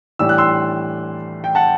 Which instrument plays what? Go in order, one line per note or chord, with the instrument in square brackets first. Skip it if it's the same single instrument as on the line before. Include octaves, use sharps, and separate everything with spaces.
[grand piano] A2 E3 G3 D4 E6
F#6
C6 E6
G5
F#5 A5